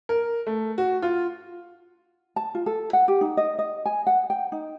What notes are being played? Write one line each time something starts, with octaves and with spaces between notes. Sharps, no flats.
A#4
A3
F#4
F4
A5
F4
A4
F#5
G4
D#4
D#5
D#5
G#5
F#5
G5
D#4